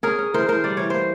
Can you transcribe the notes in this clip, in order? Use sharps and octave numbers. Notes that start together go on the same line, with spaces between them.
C#4 G#4 A#4
C#4
E3 A#4 C5
E3 A#4 C5
G3 D5
E3 C#5
A#3 C5